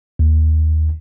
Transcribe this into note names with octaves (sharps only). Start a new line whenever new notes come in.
D#2